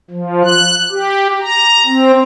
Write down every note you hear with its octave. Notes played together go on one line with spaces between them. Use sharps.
F3
F#6
G4
A#5
C4